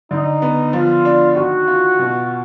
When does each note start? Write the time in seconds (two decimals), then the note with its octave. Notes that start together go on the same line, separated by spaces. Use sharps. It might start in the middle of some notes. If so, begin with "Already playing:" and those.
0.11 D3 D#4
0.42 B3
0.73 F3 F4
1.05 D4
1.36 D#3 F#4
1.68 F4
1.99 B2